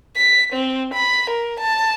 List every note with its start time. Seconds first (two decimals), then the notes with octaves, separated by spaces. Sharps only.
0.16 B6
0.53 C4
0.94 B5
1.30 A#4
1.60 A5